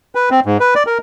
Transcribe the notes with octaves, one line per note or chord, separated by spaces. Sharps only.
B4
C4
G#2
B4
D5
A#4